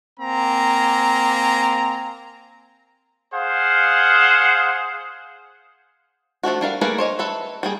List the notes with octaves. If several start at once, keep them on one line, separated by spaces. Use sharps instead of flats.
A#3 C4 G#5 A#5
G#4 C5 F5 F#5
F3 A3 D4 F#4
G3 D4 A#4 F5
A3 A#3 G#4 A#4 B4
C5 C#5 D#5
A4 B4 E5
G3 A#3 G#4